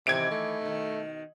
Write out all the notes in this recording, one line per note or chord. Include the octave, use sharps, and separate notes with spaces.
C3 D#3 E3 G#6 D7
A3
B2 D#3